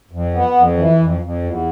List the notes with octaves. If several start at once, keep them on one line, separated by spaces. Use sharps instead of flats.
F2
B3
F2
E3
F2
F2
E2